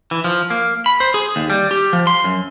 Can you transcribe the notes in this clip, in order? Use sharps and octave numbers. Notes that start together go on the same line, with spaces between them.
E3
F3
A#3
B5
C5
G#4
D#2
G3
G4
F3
C6
F#2